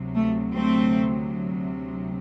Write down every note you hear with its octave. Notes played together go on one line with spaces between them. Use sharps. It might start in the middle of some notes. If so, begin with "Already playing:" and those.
Already playing: D2 C3 F#3
A3
A3 C4